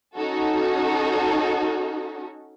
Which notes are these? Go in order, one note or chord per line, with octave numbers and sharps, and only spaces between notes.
C#4 D#4 F#4 A4